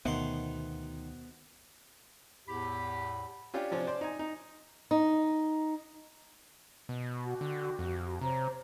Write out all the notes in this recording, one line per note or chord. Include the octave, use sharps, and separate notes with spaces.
D2 B2 D#3 B3 C5 E5 F#5 C6
E2 A2 G4 B5
C#4 D4 F4 G4
C3 F3 C#4 D4
C5 D5
D#4 G#5
D#4
D#4
B2
F#4 G4
D3
F2
C3 C5 C#5 A#5